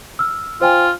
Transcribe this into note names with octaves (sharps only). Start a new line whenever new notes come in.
E6 F6
F4 C5 G5 G#5